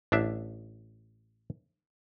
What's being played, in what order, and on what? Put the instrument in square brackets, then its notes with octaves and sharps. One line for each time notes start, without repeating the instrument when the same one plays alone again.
[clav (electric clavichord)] A1 D4 E5